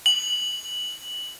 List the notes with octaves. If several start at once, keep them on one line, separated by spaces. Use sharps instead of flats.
F#7